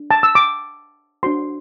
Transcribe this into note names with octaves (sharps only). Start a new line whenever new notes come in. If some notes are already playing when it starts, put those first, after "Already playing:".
Already playing: D4
A5
E6
D6
D4 F#4 C5 C6